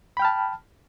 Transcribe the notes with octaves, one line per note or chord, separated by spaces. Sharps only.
G5 A5 B5 F6